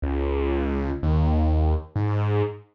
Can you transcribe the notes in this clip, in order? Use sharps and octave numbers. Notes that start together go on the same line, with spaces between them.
C#2
D#2
G#2